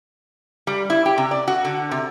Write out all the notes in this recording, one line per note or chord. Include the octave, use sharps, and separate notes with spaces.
G3
E4
G4
C3
D5
F#4
D3
C3